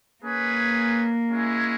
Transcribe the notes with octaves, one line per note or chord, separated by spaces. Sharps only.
A#3 C#4 G#4 B4
G#3 C#4 E4